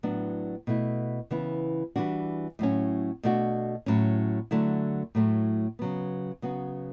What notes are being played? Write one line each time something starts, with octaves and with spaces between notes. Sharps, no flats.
A2 F#3 B3 D4
B2 A3 E4
C#3 E3 B3 E4
E3 G3 D4 F#4
A2 F#3 C#4
B2 A3 D4 F#4
A2 F#3 C#4
D3 F#3 A3 E4
A2 F#3 A3
C#3 F#3 B3
C#3 F#3 B3 F#4